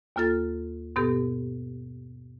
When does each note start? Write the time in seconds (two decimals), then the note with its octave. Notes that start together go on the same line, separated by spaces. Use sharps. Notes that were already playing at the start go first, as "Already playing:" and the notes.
0.16 D#2 A#3 F4 A4 A6
0.96 G2 B2 B3 G4 A4